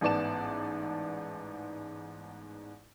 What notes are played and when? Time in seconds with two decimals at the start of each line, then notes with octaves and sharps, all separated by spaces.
0.01 A1 G#2 B3 D5 A5 E7